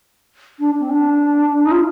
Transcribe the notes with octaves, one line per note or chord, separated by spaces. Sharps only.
D4
C4
D4
D#4
F4